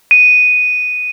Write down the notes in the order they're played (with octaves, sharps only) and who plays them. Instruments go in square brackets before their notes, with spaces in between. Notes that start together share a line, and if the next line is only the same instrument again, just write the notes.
[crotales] D#7